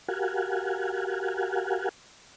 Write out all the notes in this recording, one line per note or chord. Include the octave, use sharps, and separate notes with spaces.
F#4 G4 A#4 F5 F#5 G#5